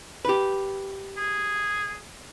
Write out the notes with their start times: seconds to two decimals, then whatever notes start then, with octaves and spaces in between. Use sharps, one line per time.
0.25 G4 B4
1.17 G#4